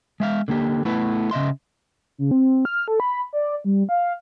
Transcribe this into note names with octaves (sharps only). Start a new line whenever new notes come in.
G#3 E5 F5
D3 A#3 G4
A3 B3 E4 B4
C#3 D#5 E5 C6
C#3
C4
F6
A4
B5
D5
G3
F5